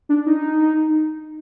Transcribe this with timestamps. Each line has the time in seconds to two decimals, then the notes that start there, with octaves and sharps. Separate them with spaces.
0.09 D4
0.27 D#4